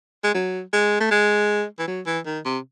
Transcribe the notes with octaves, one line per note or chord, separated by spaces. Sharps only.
G#3
F#3
G#3
A3
G#3
E3
F#3
E3
D#3
C3